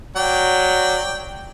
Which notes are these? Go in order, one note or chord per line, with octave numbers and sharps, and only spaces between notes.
F#3 D5 G5